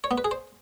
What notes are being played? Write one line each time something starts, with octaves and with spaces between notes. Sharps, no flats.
C#5
B3
B4
G#4
C5